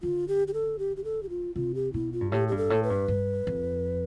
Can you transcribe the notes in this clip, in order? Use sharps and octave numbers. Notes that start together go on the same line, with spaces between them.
D3 F4
G4
G4
A4
G4
G4
A4
G4
F4
C3 F4
G4
B2 E4
F4
G2
A2 G4
G2 G4
A4
A2
B4
G2
G2
F2